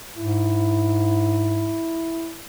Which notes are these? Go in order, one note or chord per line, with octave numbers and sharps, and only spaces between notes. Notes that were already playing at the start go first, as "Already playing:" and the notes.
G#2 E4